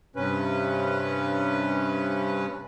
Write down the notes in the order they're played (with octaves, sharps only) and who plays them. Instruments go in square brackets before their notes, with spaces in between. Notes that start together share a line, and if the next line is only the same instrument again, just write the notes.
[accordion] G2 C3 C#4 B4